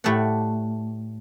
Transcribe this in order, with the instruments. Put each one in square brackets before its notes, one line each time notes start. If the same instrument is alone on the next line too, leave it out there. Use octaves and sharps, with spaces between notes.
[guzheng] A2 A3 G4 A4 D5 F#5